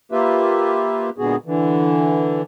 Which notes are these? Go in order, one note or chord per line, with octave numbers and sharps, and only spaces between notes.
A#3 F4 G4 B4 E5
A#2 D3 G#3 B3 F#4 G#4
D3 E3